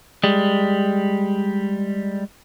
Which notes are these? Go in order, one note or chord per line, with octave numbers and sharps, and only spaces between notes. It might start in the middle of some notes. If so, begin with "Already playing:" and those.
G3 G#3